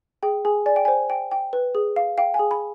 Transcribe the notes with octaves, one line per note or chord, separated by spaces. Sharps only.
G#4 G5
G#4 G#5
D5 G#5
G5
C5 G#5
G5
G5
B4
G#4
F5
F5 G5
G#5
G#4
B5